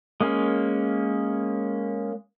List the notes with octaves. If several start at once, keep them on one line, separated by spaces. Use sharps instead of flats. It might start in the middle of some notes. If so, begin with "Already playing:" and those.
G#3 A#3 C#4